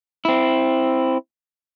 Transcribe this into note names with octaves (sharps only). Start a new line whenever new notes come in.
C4 E4